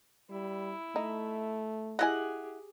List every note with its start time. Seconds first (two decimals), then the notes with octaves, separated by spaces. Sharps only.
0.30 G3 E4
0.96 A3 D#4
1.99 E4 G4 G#4 D#5 E5 F#5 G#5